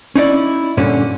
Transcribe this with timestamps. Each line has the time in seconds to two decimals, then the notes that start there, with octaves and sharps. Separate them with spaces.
0.15 C#4 D#4 E4 D5
0.77 G2 A#2 D3 C#4